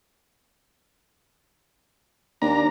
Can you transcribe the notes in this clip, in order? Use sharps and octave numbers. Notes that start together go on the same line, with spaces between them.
D#2 D4 A#5